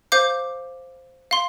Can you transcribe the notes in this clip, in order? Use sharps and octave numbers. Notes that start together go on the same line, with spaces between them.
C5 F5 D6 G6
F5 C6